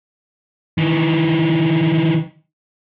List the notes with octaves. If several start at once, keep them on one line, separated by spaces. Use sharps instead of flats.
D#3 E3